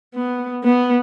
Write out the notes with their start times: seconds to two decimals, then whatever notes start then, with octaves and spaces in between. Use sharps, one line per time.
0.15 B3
0.64 B3